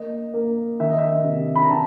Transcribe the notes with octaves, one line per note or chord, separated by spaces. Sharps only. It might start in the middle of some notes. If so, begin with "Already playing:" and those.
Already playing: A#3 D#5
A#3
D#3 E5
D#5
E5
C3
B5
A#5
D#3 A5